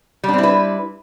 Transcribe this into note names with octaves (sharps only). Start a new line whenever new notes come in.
G3 C4 D4 E4 B4